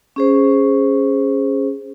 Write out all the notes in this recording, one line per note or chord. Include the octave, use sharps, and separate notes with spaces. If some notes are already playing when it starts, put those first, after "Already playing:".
C#4 G#4 C5